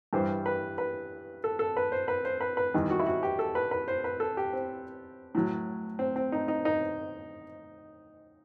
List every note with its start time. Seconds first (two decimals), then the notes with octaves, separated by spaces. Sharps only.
0.13 G2 E3 G3 C5
0.46 B4
0.78 B4
1.44 A4
1.59 A4
1.77 B4
1.92 C5
2.08 B4
2.25 C5
2.41 B4
2.57 B4
2.74 E2 D#3 G3
2.90 F#4
2.99 E4
3.07 F#4
3.23 G4
3.39 A4
3.55 B4
3.71 B4
3.88 C5
4.04 B4
4.20 A4
4.37 G4
4.53 C4
5.35 A2 F#3
5.99 C4
6.16 C4
6.32 D#4
6.48 D#4
6.65 D#4